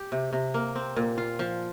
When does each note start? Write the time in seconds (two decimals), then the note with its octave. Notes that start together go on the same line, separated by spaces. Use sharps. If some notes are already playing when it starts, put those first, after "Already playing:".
Already playing: G4
0.12 C3
0.33 C3
0.54 A#3
0.76 C4
0.96 A#2
1.18 F4
1.39 F3